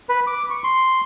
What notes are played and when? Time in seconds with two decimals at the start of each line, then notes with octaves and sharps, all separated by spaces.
0.09 B4
0.27 D6
0.50 C#6
0.64 C6